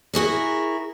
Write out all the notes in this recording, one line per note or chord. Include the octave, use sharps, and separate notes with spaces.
E4 F#4 G#4 A#4